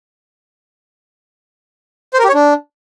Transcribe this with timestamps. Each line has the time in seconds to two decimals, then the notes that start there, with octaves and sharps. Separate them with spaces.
2.14 C5
2.19 A#4
2.24 G4
2.29 C#5
2.34 D4